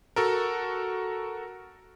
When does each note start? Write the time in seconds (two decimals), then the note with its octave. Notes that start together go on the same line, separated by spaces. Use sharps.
0.16 F#4 A4 A#4